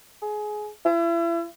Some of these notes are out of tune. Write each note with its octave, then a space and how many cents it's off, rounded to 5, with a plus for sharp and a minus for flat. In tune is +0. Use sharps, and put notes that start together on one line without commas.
G#4 +20
E4 +35